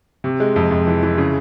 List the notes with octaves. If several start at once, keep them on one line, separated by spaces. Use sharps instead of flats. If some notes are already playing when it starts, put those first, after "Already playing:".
C3
G#3
F2
F2
E3
E3
C#3